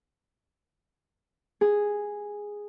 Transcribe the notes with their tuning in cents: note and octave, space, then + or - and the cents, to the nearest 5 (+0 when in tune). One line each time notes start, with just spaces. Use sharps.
G#4 -5